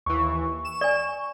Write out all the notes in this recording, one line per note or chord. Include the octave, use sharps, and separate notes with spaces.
D#2 E3 C#6
E7
D5 G#5